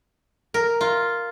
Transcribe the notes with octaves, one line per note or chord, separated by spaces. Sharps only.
A#4
F4